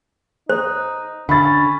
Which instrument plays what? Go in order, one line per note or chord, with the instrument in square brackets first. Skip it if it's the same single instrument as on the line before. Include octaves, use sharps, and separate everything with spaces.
[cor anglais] D#4 [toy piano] C5
[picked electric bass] D3 [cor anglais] C#4 [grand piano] B5 A6